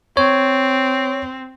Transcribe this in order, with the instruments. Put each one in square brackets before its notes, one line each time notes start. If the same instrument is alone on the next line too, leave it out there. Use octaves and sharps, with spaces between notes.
[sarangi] C4 [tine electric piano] C#5